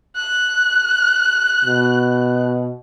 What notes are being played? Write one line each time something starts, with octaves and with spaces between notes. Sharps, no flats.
F#6
B2